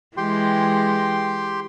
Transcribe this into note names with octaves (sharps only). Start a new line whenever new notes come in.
E3 G#3 G4 G5 C6